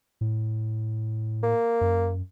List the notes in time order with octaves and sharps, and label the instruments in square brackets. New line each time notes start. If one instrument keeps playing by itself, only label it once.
[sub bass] A2
[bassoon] A#3
[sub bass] F#2